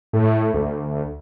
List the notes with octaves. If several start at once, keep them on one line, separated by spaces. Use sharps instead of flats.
A2
D2